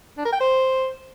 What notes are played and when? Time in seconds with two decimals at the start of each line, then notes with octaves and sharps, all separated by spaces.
0.18 D4
0.25 A#4
0.33 G5
0.40 C5